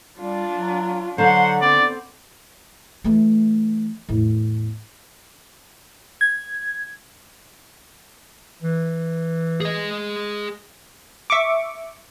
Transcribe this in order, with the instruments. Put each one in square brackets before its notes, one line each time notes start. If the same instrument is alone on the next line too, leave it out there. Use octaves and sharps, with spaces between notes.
[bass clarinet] G3 [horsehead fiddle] D4 F4
[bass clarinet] F#3
[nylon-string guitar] D3 [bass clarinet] F#3 [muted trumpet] C5 [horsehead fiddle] F#5
[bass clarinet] B3 [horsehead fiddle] C4 [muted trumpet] D5
[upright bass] E3 A3
E2 A2
[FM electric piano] G#6
[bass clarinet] E3
[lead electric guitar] G#4 D#5
[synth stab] E5 C#6 D6